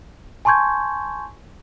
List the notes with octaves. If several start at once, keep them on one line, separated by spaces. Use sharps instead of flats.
G#5 A5 C6 C#6 G6 G#6